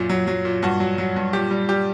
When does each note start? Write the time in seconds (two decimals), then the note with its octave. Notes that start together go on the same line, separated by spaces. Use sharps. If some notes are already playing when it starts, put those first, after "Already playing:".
Already playing: F#2 A#2
0.10 F#3
0.27 F#3
0.45 A#2
0.63 G2 F#4
0.80 F#3
0.98 F#3
1.16 G2
1.33 A#2 G4
1.51 G3
1.69 G3 G4